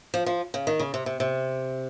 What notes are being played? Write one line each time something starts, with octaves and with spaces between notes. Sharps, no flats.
F3
F3
C#3
D#3
C#3
C3
C3
C3